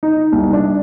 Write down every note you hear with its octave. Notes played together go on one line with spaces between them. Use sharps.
D#4
C2
D4